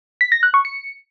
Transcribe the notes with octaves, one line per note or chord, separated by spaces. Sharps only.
B6
A#6
F#6
C#6
C#7